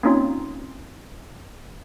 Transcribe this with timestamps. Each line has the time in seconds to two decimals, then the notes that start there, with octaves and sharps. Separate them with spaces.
0.03 A#3 C4 C#4 D#4 F4 C#5